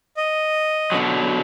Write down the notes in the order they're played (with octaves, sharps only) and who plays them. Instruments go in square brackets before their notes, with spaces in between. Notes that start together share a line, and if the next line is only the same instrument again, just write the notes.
[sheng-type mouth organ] D#5
[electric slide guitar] B2 D3 F#3